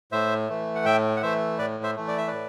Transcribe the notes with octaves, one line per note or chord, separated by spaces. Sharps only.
A2 C5 E5
E3 A3
F#5
A2 E5 G5
F#5
E3 A3 C5 E5
A2 B4 D5
C5 E5
E3 A3
D5
E5
A2 B4 D5